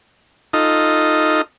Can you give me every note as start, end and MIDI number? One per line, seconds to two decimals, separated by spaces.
0.53 1.42 63
0.53 1.42 65
0.53 1.42 69
0.53 1.42 75